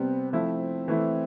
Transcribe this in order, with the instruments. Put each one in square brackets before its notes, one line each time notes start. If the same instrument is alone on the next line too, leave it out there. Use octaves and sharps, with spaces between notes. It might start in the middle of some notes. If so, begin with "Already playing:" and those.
Already playing: [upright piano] C3 G3 B3 [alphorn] C4
[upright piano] F3 A3 E4 [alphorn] C4
[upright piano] E3 A3 E4